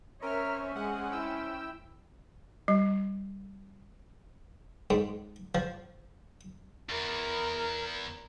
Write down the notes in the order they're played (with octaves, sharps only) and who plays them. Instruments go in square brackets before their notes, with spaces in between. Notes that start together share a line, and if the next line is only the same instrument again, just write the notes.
[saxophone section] C4 C#4 [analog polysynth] A#4 F6 [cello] C#5 E5
[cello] G#3 [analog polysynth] G#4 F#5
[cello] E4 [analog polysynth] G5 E6
[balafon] G3
[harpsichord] G#2
F3
[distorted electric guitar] E2 [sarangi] A#4